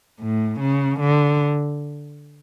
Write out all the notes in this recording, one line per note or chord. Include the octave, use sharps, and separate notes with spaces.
A2
C#3
D3